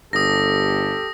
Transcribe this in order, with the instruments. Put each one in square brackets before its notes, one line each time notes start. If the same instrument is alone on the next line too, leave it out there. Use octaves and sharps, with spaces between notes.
[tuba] G1 [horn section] G4 A4 [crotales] D#6 A#6